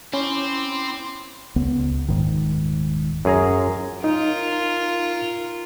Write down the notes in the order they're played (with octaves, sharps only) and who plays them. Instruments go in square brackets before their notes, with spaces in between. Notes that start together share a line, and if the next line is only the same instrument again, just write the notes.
[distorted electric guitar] C4 [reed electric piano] C#4 [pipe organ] E4 C6 D6
[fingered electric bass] C#2 B3
D#1 G#2 D#3
[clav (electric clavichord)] F#2 G#4 A#5
[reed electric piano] D#4 [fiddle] F4 A#4